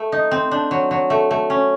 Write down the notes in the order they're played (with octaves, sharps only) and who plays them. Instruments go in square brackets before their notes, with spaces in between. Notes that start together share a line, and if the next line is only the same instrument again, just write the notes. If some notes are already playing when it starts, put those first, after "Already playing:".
Already playing: [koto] A3
D#4
C4
D4
F#3
F#3
A3
A3
C#4